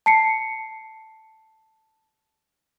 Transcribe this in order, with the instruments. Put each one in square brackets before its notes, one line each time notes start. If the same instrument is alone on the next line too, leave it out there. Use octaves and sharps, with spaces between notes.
[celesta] A5 C7 C#7